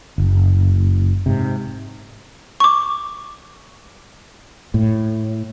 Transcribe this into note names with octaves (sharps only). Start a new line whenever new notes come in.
F#1
G#2 C3
C#6 D6
A2